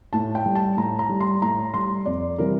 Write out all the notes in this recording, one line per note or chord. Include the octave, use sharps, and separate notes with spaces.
A2 A5
G5
G3
A5
A2 A#5
A#5
G3
C6
A2 A#5
G3 C6
F2 D5
C3 E3 G3 A#4